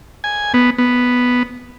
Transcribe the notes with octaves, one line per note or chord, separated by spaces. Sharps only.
G#5
B3
B3